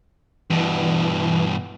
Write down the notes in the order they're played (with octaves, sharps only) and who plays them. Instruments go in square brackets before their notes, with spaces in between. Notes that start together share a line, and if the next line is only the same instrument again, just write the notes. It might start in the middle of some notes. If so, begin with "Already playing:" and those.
[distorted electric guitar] G2 B2 [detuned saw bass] E3